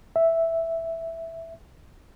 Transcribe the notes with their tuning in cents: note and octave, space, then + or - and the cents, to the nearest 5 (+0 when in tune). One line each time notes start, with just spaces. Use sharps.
E5 +0